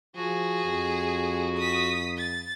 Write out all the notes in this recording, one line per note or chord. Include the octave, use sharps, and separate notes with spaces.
F3 F#4 G#4
F2
D#6 B6
A6